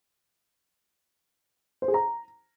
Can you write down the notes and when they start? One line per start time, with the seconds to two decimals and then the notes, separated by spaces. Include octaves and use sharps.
1.82 C5
1.88 G#4
1.94 A#5